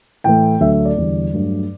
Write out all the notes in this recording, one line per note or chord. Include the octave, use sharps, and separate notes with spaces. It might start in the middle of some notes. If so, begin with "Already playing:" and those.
A2 E3 A3 G5
D2 D3 F#3 A3 E5
E5
D5
E2 D3 G3
G2 F#3 A3